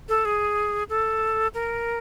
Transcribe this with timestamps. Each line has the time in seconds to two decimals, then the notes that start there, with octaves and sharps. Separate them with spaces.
0.09 A4
0.25 G#4
0.89 A4
1.54 A#4